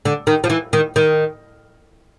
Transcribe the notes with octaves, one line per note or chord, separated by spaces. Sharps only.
D3
D#3
F3
E3
D#3
D#3